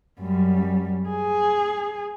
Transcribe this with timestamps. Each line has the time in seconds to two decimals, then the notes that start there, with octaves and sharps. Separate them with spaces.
0.21 F#2 G3
1.09 G#4